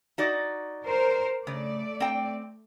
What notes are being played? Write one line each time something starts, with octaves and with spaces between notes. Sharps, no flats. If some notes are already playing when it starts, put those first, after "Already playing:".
D#4 F#4 D5
A#4 C5
C#3 A3 D5
C4 G5